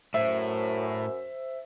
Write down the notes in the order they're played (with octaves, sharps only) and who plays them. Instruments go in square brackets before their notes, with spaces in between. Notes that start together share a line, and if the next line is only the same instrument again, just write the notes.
[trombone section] F#2 [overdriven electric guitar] A2 [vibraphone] C5 [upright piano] E5